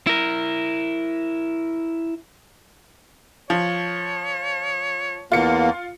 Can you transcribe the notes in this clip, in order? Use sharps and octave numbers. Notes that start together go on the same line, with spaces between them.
E4 A#4
F3 C#5
E2 A#3 F4 C#7